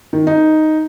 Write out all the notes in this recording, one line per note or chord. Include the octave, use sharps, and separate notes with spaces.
D#3
D#4